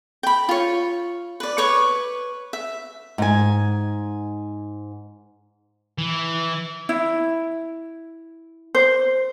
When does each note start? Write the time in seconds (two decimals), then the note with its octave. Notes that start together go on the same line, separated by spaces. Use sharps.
0.23 G5 B5
0.49 F4 C#5
1.40 B4 D5
1.58 B4 C#5 C#6 D6
2.53 E5
3.18 G#2 G#5
5.98 E3
6.89 E4
8.75 C5